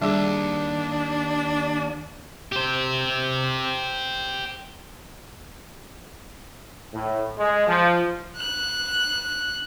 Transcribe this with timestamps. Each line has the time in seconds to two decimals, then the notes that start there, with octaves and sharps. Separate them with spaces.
0.02 D#2 G3 D4 G#4
2.52 G4 C5
6.93 A2
7.37 G#3
7.67 F3
8.36 F#6